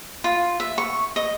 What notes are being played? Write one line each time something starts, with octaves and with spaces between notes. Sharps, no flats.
F4
E5
C#6
D#5